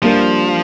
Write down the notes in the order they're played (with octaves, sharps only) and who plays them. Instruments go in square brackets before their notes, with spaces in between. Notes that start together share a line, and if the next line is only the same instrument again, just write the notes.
[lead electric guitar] F3 [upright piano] G3 A#3 D4